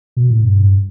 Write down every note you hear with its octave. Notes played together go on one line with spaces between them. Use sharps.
B2
A2
G2